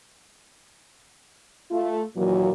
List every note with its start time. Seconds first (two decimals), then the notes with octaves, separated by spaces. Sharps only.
1.71 A3 F4
2.16 D#2 A#2 E3 F#3